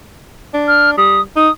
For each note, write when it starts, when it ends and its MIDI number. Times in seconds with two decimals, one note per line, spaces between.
0.54 0.96 62
0.68 0.90 89
0.97 1.22 55
0.97 1.21 87
1.36 1.49 63
1.36 1.51 87